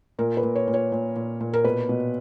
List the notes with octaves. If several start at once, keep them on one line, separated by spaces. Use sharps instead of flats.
A#2 A#4
B4
A#2
C#5
A#2
C#5
A#2
A#2
A#2
A#4
B2 B4
B2